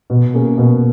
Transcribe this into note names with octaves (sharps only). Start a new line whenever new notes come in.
B2
A#3 C#4 G#4
B2